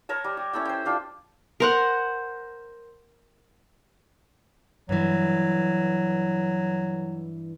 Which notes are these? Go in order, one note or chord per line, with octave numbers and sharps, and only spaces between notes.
A#4 C#5 A5
G3
G4
C#4 E4 A4 G5
C5 G5
D4 F4 G4
A#4 C5 F#5
G2 E3 F#3